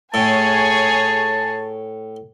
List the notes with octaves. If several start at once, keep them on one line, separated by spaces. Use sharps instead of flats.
A2 G#4 C#5 G#5 A5